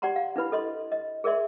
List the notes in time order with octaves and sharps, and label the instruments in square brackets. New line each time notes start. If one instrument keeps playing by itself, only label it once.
[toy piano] G4 D5 F#5 A#5 C6
F5
D4 E4 B4 B5
A4 D#5 C6
D#5
G#4 A#4 D5 E5 C6